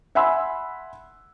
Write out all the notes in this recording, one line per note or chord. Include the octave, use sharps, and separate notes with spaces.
E5 F#5 G#5 B5 C6 E6